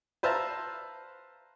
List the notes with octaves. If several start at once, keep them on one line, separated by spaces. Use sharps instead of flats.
B4 C5 E5 F5 A5 A#5